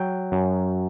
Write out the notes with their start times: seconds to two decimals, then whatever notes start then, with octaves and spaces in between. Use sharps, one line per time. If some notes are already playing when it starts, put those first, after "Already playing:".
Already playing: F#3 G5
0.32 F#2